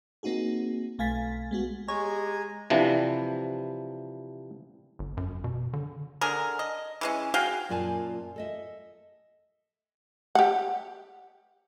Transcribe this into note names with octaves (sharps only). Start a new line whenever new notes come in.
A#3 C4 D#4 F#4 G#4
B1 A3 F5 G#5 A6 B6
G#3 B3 F#4
G#3 G4 C#5 G#5 A#5
C3 E3 F3 D4
G1
F#2
B2
D3
D3 G#4 A#4
D#5
E3 G#3 C#4
F#4 G#4 F5 G5
F#2 A#2 F4 D5 G#5 A5
A4 D#5 E5
G4 F#5